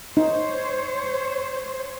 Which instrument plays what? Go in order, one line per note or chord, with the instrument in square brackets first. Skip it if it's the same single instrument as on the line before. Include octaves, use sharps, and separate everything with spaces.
[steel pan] D#4 [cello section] C5 C#5